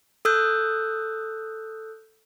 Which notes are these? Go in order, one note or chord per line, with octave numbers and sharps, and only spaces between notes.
A4 D#6 E6 F#6 G6